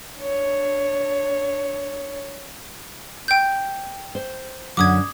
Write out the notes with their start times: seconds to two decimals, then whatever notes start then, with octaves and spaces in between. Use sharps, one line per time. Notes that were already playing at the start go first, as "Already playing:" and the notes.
0.20 D4 C#5
3.28 G5 G6
4.15 C5
4.77 F#2 D3 F#3 D6 D#6 G#6